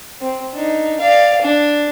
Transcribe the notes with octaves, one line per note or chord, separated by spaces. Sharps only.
C4
D4 D#4
D5 F5
D4